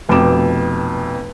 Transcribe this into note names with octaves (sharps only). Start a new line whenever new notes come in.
F1 F2 B2 G5 D6 E7